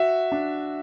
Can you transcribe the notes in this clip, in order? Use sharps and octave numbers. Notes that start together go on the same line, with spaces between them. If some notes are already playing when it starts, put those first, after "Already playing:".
Already playing: F#4 E5
D4